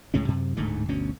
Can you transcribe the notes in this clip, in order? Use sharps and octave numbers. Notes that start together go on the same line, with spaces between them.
C#2 A2 G#3 C#4
F#2 C3
D1 G#2 D3 A3
G1 D2 B2 C#4